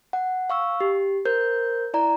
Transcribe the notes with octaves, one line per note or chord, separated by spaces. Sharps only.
F#5
F5 C#6 E6
G4
A#4 C5 G6
E4 D5 A#5